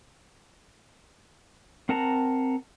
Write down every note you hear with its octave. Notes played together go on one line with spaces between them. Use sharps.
C4 A#4 F#5 A5 A#5